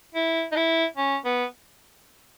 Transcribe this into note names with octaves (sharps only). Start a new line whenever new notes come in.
E4
D#4
E4
C#4
B3